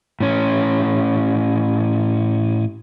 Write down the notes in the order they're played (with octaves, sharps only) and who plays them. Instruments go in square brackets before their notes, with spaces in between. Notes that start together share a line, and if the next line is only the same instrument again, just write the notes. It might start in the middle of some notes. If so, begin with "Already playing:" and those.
[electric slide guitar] A2 C#4